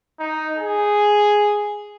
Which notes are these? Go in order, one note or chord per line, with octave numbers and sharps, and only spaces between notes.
D#4
G#4